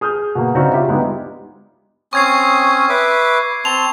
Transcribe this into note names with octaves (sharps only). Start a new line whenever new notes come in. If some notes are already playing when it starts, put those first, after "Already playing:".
G#4 D#6 F6 G6
B2 A#3
C#3 C4 D4 D#4 F#4
F4 G4 E5
G3 G#3 B3 D4 D#4
C4 C#4 C#6 D#6 G#6 C7
B4 E5 D6
C4 A5 C6 F7